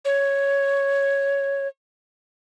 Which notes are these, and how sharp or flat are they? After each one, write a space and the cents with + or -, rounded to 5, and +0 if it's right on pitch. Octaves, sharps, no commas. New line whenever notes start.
C#5 +0